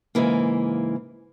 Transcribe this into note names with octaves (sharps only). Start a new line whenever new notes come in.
G#2 C#3 E3 A#3